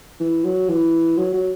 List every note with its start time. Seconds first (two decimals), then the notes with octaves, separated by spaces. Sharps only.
0.20 E3
0.44 F#3
0.69 E3
1.17 F#3
1.34 F#3